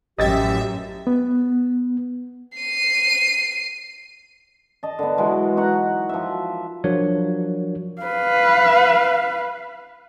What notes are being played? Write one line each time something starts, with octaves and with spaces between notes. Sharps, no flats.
A1 F#2 G4 D#5 E5 A6
B3
C7 D#7
D#5 A5
D3 B3
B2 E3 F#3 G#3
D#4 F#4 F#5 A#5
F3 E5
F3 F#3 D4 F#4 A#4 C#5
B4 F5